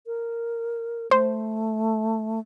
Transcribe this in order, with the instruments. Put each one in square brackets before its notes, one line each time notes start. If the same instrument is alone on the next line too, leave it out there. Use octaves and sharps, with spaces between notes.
[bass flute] A#4
[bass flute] A3 [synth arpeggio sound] C5